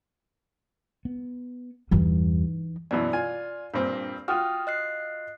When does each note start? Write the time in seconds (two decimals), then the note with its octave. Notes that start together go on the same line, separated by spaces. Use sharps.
1.05 B3
1.91 E2 G2 E3 G3 D#4
2.91 F#2 B2 E3 D5
3.13 F4 G#5
3.74 G2 A#2 C4 D4
4.28 F4 F#4 G5 D#6 F6
4.67 D#5 F#6 C7